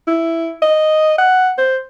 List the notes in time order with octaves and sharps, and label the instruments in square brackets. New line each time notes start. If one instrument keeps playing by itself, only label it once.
[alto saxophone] E4
D#5
F#5
C5